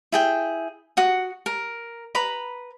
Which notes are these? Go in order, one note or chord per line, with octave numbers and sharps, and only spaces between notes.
E4 G#4 G5
F#4 F#5 D#6
A#4
B4 A#5 B5